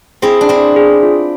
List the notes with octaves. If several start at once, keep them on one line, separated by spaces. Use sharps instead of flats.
C4 E4 G#4
D4
C4 E4 G#4
G#4
F4